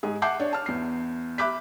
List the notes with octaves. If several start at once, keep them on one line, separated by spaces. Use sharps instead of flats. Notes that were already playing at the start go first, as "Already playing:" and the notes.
G#2 G#4
E5 F#5 A5 D6 G6 C7
D4 C#5
A5 F6
E2 C7
E5 B5 D6 F#6 G6 B6